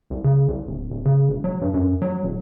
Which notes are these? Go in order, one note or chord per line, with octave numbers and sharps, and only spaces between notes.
C2
C#3
C2
D1
D1
C#3
E1
F#3
G2
F#2
F#3
D#1